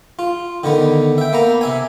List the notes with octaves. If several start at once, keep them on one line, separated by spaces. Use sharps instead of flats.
F4
D3 D#3 B3
E5 G5
A#3 B3 A#5
C3 E5 G#5